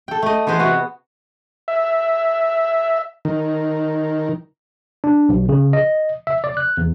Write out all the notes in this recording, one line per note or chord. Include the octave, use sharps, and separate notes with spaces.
A4 G5
A3 D#5
E3 B3 G#4 B4 C5 D#5
C3 B3 F#4
E5
D#3
D4
B1
C#3
D#5
E5
D5
F#6
E2